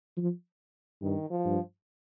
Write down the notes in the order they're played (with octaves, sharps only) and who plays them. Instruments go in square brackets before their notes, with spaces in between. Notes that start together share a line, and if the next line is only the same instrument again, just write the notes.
[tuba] F3
[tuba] G2 [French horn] D#3
[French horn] F3
[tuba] G2